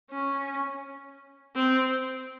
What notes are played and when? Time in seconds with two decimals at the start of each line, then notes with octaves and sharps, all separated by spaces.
0.11 C#4
1.56 C4